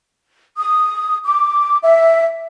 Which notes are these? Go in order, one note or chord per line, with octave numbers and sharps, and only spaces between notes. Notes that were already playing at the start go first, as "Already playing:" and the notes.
D#6
D6
E5